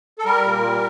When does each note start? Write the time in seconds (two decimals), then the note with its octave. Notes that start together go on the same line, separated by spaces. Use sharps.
0.19 A4
0.25 G3 A#4
0.44 A#2
0.63 G3